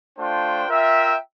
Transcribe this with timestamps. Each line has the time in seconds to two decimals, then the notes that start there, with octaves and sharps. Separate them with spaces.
0.18 A3 D4 F4 C5 G5
0.67 F4 A#4 E5 G5